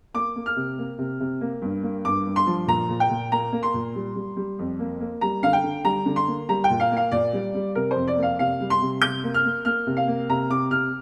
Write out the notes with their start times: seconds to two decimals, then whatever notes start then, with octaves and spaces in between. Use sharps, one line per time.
0.14 A#3 D6
0.36 A#3
0.46 F6
0.56 C3
0.78 A#3
0.98 C3
1.20 C3
1.41 A#3
1.62 G2
1.83 A#3
2.05 G2 D6
2.26 G2
2.36 C6
2.47 F3
2.67 A#2 A#5
2.89 A#2
3.00 G5
3.10 A#2
3.31 A#3 A#5
3.52 A#3
3.63 C6
3.74 A#2
3.95 G3
4.15 G3
4.37 G3
4.59 F2
4.79 A#3
5.00 A#3
5.21 G3 A#5
5.43 D3 F5
5.53 G5
5.64 D3
5.84 G3 A#5
6.06 D3
6.16 C6
6.27 A#3
6.49 G3 A#5
6.64 G5
6.70 A#2
6.80 F5
6.91 A#3
6.97 F5
7.12 A#2 D5
7.33 G3
7.55 G3
7.75 C3 A#4
7.91 F2 C5
8.08 D5
8.17 A#3
8.23 F5
8.39 C3 F5
8.60 G3
8.70 C6
8.82 C3
9.02 C3 G6
9.23 A#3
9.34 F6
9.45 A#3
9.65 A#3 F6
9.87 C3
9.97 F5
10.07 A#3
10.30 C3 A#5
10.50 C3 D6
10.71 C3 F6